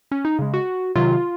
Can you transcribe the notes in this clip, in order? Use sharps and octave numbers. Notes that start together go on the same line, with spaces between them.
C#4
D#4
C#3 G#3
F#4
C3 D#3 F#3 F4